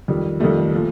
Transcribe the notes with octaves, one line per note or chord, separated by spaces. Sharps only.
F2 D#3 G3
F2 D#3 G3 A3
A#2 F3